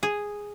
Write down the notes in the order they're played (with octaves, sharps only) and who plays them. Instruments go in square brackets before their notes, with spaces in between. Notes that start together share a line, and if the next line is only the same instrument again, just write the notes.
[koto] G#4